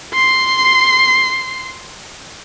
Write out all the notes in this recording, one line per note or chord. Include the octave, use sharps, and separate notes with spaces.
C6 C7